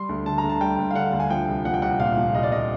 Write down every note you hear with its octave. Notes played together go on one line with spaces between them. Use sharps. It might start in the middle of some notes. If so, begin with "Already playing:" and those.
Already playing: G3 C6
D2
D3 A5
A#5
D2
A5
G3 G5
D2
F5
D3 F#5
D2
G#5
F3 G5
C2
F3 F#5
G5
C2 F#5
A#2 F5
F3
C2 D#5
D5
C2 D#5